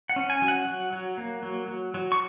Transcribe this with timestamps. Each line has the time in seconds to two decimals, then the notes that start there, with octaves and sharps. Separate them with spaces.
0.09 F#5
0.16 C#4
0.30 G#5
0.42 F#3
0.48 F#5
0.67 F#3
0.93 F#3
1.18 A#3
1.43 F#3
1.68 F#3
1.94 F#3
2.12 C#6